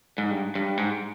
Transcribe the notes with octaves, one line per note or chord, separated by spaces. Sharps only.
G#2
G2
G2
G#2